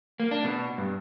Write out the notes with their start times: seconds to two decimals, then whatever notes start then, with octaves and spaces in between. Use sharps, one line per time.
0.20 A#3
0.31 D4
0.44 B2
0.78 G2